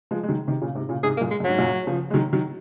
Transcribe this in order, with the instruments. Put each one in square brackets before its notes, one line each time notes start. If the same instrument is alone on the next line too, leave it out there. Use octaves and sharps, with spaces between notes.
[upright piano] F3 G#3
G#3
D#3 F#3
C3 D#3
A#2 C#3
G#2 C3
A#2 C#3
[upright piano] G#2 C3 [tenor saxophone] G#4
[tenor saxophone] A#3
[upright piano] F#2 A#2
[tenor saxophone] G#3
[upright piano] F#2
[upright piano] G#2 [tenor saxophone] F#3
[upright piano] F#2 A#2
C#3 F3
G#3
D#3 F#3
D#3 F#3